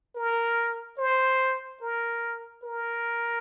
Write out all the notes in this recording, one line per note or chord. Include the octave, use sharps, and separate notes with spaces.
A#4
C5
A#4
A#4